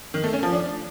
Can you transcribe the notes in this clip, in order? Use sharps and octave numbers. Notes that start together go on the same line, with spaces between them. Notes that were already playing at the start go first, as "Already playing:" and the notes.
D#3
A3
C#4
F3
D4